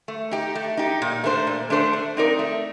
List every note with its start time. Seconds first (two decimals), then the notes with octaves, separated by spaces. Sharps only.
0.08 A3
0.31 D#4 G4
0.55 A3
0.77 D#4 G4
1.02 A#2
1.24 A3 D4 A4 C5
1.47 A#2
1.70 A3 D4 A4 C5
1.93 A3
2.17 C4 D#4 A#4 D5
2.39 A3